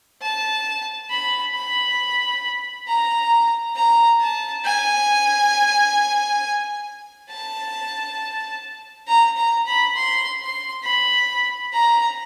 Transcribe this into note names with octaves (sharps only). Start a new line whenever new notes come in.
A5
B5
B5
A#5
A#5
A5
G#5
A5
A#5
A#5
B5
C6
C6
B5
A#5